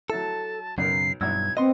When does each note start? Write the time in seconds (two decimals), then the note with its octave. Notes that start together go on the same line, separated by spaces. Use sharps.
0.10 F#3 E4 A4 A5
0.78 B1 F#2 C#3 A#4 C7
1.21 B1 G2 E4 E6 G#6
1.57 B3 C4 D#5 C6